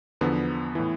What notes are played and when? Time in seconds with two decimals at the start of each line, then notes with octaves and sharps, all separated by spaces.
0.21 E2 D3 F3 B3
0.75 A2 E3